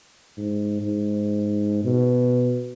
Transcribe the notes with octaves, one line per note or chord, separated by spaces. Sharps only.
G#2
G#2
B2